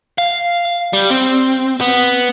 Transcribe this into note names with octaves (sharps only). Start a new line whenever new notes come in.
F5
G3
C4
B3